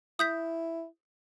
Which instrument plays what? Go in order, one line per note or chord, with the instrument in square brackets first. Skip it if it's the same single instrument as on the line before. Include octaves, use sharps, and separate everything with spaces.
[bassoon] E4 [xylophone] D#6 G6 B6